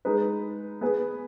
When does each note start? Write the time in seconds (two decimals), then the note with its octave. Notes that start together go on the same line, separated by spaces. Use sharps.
0.05 G#3 D#4 B4
0.81 B3 G#4 B4